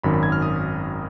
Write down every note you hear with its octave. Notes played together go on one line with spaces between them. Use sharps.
G#1 F#2 D#3 B5
B5
G#6
F6
D#6